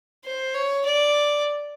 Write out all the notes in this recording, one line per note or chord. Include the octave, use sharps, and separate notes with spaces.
C5
C#5
D5